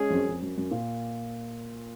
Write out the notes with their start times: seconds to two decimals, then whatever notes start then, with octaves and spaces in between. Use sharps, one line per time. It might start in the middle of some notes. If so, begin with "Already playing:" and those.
Already playing: G#3 C#4 G#4
0.10 F2
0.14 F#2
0.28 F2
0.42 F#2
0.58 F#2
0.71 A#2